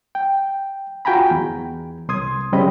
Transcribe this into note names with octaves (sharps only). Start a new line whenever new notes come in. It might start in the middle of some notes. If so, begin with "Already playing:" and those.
G5
F4 F#4 G5 G#5 A#5 B5
E2
C2 C6 D#6 G#6
F#2 C#3 G3 C4 D#5 B5